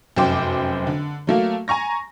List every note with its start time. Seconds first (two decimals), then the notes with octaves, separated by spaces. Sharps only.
0.17 F1 F#2 C4 C5 G5 D6
0.87 D3
1.27 F#3 A3 A#3
1.68 G#5 A#5 C#6 A#6